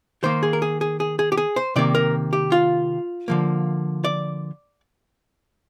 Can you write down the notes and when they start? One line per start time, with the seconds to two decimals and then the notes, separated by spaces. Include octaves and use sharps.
0.23 D#3 A#3 C5
0.43 G#4
0.53 A#4
0.62 G#4
0.81 G#4
1.00 G#4
1.19 G#4
1.32 G4
1.37 G#4
1.56 C5
1.76 C3 D#3 A#3 D5
1.95 A#4
2.33 G4
2.52 F4
3.28 D3 F3 A#3
4.04 D5